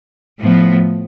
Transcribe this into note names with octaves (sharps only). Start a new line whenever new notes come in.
A2 F3 B3